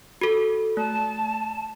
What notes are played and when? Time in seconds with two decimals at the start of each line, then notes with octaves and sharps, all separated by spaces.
0.21 F#4 A4
0.77 A3 A5